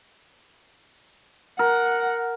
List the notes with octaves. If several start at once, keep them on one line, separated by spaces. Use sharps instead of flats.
A#4 F#5